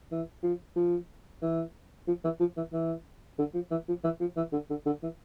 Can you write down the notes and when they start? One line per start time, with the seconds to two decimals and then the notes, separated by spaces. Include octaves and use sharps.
0.12 E3
0.43 F3
0.76 F3
1.42 E3
2.08 F3
2.24 E3
2.40 F3
2.57 E3
2.73 E3
3.39 D3
3.54 F3
3.71 E3
3.88 F3
4.04 E3
4.21 F3
4.37 E3
4.53 D3
4.70 D3
4.86 D3
5.03 E3